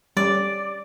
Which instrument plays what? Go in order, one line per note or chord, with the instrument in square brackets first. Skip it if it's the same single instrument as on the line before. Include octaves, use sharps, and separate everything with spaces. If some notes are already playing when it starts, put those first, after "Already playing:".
[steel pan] G3 C#4 [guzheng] D5